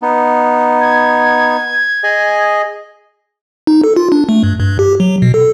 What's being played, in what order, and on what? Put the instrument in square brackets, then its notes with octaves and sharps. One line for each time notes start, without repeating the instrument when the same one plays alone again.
[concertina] B3 D#4
[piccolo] G#6
[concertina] G#4 D#5 G#5
[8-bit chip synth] D#4
A4
F4
D4
A3
G2
G2
G4
F#3
B2
A4